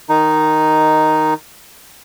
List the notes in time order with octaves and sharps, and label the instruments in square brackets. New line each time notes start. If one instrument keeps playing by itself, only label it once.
[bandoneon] D#3 D#4